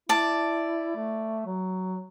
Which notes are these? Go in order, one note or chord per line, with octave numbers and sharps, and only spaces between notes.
E4 D5 A5
A3
F#3